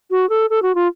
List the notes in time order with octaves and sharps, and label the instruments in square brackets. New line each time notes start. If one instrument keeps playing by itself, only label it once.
[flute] F#4
A4
A4
F#4
F4